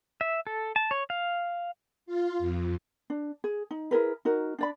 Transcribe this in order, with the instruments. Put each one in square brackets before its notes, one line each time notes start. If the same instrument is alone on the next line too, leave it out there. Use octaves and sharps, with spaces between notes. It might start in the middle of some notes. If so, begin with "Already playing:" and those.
[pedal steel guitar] E5
A4
A5
C#5
F5
[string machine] F4
F2
[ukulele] D4
G#4
D#4
E4 G#4 A#4 B4
D#4 F#4 A#4
D4 D5 B5